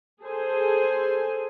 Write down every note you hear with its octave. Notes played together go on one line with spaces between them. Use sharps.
G#4 A4 C5 G#5